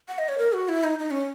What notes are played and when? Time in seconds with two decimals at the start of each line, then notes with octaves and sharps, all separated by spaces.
0.08 F#5
0.18 D#5
0.29 C#5
0.38 A#4
0.53 F#4
0.69 E4
0.84 D#4
0.99 D#4
1.11 C#4